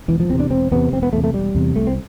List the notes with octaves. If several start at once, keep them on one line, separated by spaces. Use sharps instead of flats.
E1 E3
F3
E2 C3 C4
D4
E1 C4
E2 C3 B3
E1 C4
B3
E2 C3 A3
A3
E1 G3
E2 C3
C2 A3
C4